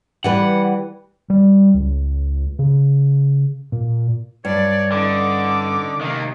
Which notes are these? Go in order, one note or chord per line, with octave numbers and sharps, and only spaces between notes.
E3 G3 B4 F#5
G3
C#2
C#3
A#2
G2 F#3 C#5 D5
D3 C#4 D#4 D6
C3 D#3 G#3 A#3